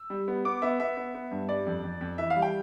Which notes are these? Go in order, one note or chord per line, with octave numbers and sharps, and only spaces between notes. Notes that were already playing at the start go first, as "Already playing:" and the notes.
Already playing: E6
G3
B3
B3 D6
B3 E5
B3 E5
B3
B3
G2
G3 D5
F2
F2
F2
E3 E5
F5
G3
G5